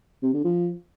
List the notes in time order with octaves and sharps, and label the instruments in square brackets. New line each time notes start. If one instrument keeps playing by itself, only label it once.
[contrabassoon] C3
D3
F3